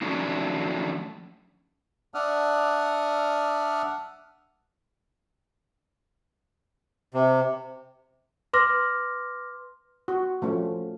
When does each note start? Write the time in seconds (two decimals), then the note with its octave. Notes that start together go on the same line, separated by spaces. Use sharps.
0.01 D#3 F3 F#3 A3 C#4 D4
2.14 D4 D5 E5 F#5 D#6 F6
7.14 C3
8.53 B4 C6 D6 F6 A#6
10.08 F#4
10.42 F3 A3 C#4